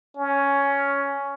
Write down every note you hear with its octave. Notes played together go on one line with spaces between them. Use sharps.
C#4